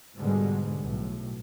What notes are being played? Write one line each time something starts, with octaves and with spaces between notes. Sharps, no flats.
G#2 B2 D3 G3 G#3
B1 A2